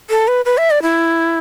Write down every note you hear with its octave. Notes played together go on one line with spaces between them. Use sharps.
A4
B4
B4
E5
D5
E4